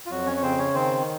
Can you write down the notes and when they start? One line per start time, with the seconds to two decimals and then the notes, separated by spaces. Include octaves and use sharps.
0.06 F4
0.11 F2 F#3 F#4
0.27 C#4 C#5
0.37 C#5
0.42 C#3 C4 C5
0.59 C#4 C#5
0.74 D#3 C4 C5